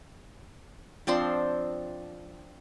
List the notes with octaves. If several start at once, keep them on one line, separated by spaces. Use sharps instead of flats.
F3 C4 D4 C6